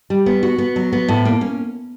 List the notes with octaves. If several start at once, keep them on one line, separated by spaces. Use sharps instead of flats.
G3
B3
F#4
B3
F#3
B3
A2
A#3
C#4